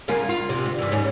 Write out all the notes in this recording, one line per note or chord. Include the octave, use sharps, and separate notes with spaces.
C#3 A#3 F4
F4
C3
D2
G2 E3
D#2 G#2 C#4